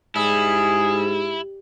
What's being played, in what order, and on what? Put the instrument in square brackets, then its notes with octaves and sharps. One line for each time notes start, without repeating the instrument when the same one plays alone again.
[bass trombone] G#2 [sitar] G3 [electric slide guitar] E4 [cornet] G#4